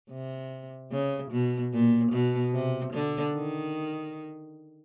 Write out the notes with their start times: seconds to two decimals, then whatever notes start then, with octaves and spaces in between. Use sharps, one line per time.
0.10 C3
0.91 C#3
1.31 B2
1.73 A#2
2.12 B2
2.53 C3
2.94 D3
3.34 D#3